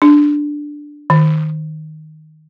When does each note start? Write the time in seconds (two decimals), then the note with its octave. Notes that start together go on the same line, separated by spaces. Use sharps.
0.02 D4
1.10 D#3